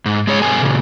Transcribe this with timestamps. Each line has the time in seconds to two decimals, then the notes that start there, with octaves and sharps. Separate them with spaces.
0.06 G#2
0.27 G#3 G#4 C#5
0.42 G2 B2 A4 G#5
0.62 A#2 C#3